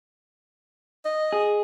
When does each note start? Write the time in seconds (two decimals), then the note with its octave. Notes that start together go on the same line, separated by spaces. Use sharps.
1.05 D#5
1.32 G#4